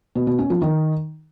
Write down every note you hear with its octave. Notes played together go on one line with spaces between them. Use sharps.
B2
B2
C#4
F3
D#3